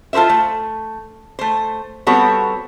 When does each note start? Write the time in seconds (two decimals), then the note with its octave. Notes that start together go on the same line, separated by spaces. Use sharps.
0.13 F4 A4 B4 C5 E5
0.30 A3
1.39 A3 C5
2.07 G3 B3 C4 F#4 A4 C#5